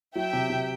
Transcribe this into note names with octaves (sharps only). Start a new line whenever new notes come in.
F#3 E5 G5
C3
C3